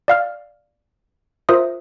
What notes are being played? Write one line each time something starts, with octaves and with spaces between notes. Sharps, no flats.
D5 F5 F6
F4 A#4 C5 E5 D#6